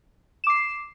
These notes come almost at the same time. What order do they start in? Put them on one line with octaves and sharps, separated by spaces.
E7 D6 C7